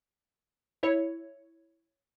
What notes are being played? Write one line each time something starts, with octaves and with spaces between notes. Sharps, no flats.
E4 C#5